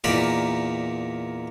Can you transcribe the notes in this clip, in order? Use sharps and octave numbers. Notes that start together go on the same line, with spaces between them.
E2 A#2 D#4 A#4 D5 B5